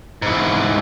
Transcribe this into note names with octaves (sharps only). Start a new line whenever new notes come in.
G#2 E3